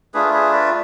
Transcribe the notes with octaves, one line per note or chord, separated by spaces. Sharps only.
A3 D4 F4 G#4 B4
G#4 B4
B4 D5